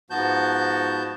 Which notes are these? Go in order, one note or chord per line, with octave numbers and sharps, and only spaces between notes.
G#2 F3 B3 F#4 A5 G6